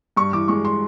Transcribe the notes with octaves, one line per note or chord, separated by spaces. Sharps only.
G2 C#6
E3 D6
G#3 C#6
C6